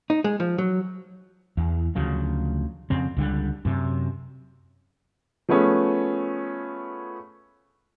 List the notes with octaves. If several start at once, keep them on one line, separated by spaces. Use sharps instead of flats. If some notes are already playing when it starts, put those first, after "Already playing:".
D#4
G#3
F3
F#3
E2
D2 C#3 F3 F#3
F2 C#3 C4
C#2 D3 G3
F#2 C3
F3 A3 B3 C#4 G#4